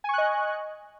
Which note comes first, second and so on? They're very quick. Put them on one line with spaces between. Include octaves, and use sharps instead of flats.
G#5 C#6 F#6 D#5